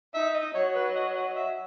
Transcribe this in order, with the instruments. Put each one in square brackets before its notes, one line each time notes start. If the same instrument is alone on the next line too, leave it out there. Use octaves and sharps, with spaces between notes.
[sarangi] D#4 [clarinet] E5
[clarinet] D#5
[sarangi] F#3 [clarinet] C#5
[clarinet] B4
D#5
D#5
E5